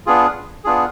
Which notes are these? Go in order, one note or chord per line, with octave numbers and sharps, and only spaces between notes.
B3 D4 F4 G#4
B3 D4 F4 G#4